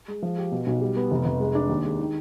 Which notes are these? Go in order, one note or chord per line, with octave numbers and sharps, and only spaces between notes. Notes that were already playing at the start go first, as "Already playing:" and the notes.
G#3
F3
G4
B2
B1
G3
B3
F1
F1
G#3
D4
D#2
G#3
D#3